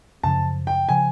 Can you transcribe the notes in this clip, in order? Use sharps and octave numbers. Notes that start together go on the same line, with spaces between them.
F#2 C#3 F3 A5
G5
C#3 F3 G#5